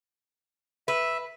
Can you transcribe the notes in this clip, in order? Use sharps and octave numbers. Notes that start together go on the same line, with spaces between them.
B4 E5